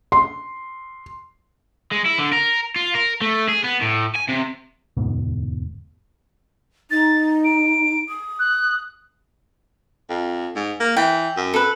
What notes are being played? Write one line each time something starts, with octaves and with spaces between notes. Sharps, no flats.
C6
G#3
E4
D3
A#4
F4
A#4
A3
G#4
B3
A2
G#5
C3
E1 D2 G#2 B2
D#4 A6
D7
D#6
F#6
F2
G#2
A#3
E3 G5
F#2
A4 B4